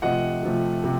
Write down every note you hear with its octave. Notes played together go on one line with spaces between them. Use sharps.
C3 F3 A3 D#5 F#5
C3 F3 A3
C3 F3 A3